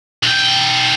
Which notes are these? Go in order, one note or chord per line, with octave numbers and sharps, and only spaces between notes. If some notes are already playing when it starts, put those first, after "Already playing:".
B1 G5